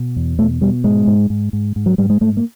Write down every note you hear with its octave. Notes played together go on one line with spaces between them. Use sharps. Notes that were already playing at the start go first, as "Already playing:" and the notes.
Already playing: B2
E2
B2 A3
B2 G3
G#2 G#3
G#2
G#2
G#2
G#2
F#3
G#2 G3
G#3
G#2 A3
A#3